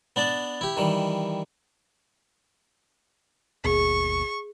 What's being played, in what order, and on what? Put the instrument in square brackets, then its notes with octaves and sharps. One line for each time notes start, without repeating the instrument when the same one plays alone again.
[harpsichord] B3 D4 D5 A5
E4 G4
D#3 E3 G3
[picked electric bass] G#1 D#2 B2 [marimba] G#4 [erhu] C#6